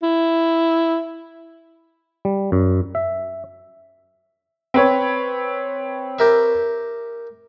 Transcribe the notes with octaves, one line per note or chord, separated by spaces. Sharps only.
E4
G3
F#2
E5
C4 B4 C#5
G4 A#4 E5